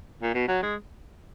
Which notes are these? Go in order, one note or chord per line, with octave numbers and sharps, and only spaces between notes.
A#2
B2
F#3
G#3